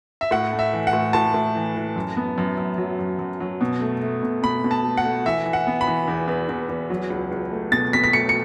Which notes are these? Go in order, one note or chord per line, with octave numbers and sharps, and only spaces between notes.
E5
A2 F#5
A3
E5
E3
F#5
A2
A2 A5
A2
E3
E3
F#2
B3
F#2
F#2
F#3
F#2
F#2
F#3
B2
A3
A3
B2
B2 B5
B2
A5
A3
F#5
A3
E3 E5
E3
F#5
B3
B5
E3
E2
E2
E2
E2
F#3
C#2
C#2
A3
B2 A6
B2 B6
B6
A3 C#7
C#7